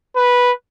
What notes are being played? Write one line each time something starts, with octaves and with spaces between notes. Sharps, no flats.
B4